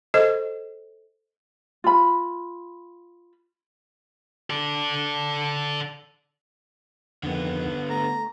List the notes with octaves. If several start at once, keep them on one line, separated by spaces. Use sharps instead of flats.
A4 C5 D#5
F4 B5
A4 D5
F2 D3 D#3 B3
A3 A#5